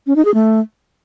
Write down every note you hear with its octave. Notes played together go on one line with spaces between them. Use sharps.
C#4
D#4
G#4
A3